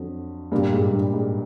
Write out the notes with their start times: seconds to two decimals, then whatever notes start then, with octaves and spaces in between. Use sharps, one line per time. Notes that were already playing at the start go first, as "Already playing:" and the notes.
Already playing: F2 D3 F#3
0.52 G2 A#2 G3 A#3
0.72 G#2
0.93 G2
1.13 G#2